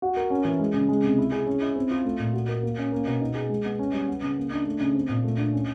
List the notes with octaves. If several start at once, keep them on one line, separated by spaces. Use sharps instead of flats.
F#4
A#4
C#4
E3
G#3
C#3
G#3
C3
E4
G#4
C#4
E4
C4
F4
A3
A#2
F#4
A#4
A#3
C#4
A#3
B2
D#4
G#4
G#3
B3
C#4
G3
B3
C#3
A#3
D4
A3
C#3
C4
A#2
A3
D4
C#4